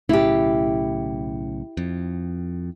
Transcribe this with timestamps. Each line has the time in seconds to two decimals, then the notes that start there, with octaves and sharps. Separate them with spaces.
0.09 B1 A2 C#3 E4 G4
1.77 F2